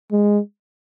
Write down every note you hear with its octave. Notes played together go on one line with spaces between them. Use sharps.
G#3